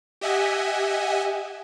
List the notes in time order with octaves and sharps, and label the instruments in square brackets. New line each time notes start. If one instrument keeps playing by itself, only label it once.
[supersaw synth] G4 D#5 E5 F#5 G#5